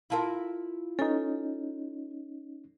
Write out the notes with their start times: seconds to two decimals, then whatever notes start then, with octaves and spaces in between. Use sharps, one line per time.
0.10 E4 F4 A#4 F5 A5 C6
0.99 C#4 D#4 A4 B4 G#5